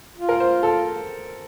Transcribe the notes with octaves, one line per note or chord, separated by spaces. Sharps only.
F4
A#4
C5
A4